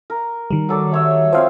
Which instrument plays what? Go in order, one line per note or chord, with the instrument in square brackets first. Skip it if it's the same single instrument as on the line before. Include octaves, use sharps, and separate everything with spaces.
[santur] A#4
[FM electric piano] D#3 G3
[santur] F#3 A4 D5
A3 C#5 E5
[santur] F3 C4 C#5 [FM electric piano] C5 F5